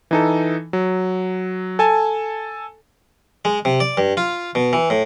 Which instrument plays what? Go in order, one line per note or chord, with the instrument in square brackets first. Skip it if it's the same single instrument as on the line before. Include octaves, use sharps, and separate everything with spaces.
[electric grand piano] E3 D#4 A4
F#3
A4 G#5 A5
[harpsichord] G#3
C3
D5
G2
F4
B2
E3
A2